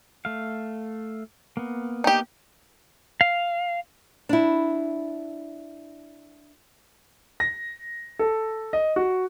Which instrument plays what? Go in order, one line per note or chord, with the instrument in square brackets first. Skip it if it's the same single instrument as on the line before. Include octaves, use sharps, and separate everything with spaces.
[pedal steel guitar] A3 F5
A#3 B3
[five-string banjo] D#4 G4 [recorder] G5
[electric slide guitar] F5
[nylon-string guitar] D4 E4
[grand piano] A#6
A4
D#5
F#4